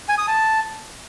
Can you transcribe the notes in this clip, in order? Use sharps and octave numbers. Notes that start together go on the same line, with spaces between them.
G#5
D#6
A5